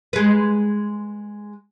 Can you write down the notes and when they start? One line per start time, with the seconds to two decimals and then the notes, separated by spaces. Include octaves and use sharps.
0.13 G#3 B4